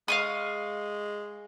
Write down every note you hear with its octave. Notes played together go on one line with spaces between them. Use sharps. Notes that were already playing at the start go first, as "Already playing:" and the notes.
G#3 F5 C#6 D#6